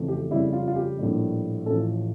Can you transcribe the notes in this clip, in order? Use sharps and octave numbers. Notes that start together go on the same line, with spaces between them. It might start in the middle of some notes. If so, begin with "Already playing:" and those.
Already playing: F2 C#3 E3 A3
G4
F2 C#3 G3 E4
F4
F4
G4
A#1 A2 G3
A1 A2 F3 A3 A4